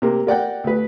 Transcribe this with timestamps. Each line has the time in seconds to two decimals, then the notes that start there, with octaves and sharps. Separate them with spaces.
0.02 C3 A#3
0.27 A#4 D5 F#5 G5
0.64 D2 B4